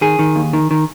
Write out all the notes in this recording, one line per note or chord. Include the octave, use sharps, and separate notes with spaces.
D#3 G#4
D#3
D#2
D#3
D#3